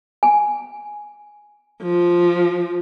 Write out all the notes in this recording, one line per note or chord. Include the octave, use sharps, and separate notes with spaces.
G#5
F3